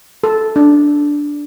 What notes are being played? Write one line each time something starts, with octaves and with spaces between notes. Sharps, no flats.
A4
D4